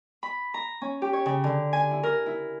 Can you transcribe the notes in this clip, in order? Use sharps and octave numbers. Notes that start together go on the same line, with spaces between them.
B5
A#5
C#4
G4
C#5
C#3
D3
G#5
E4
A#4
E4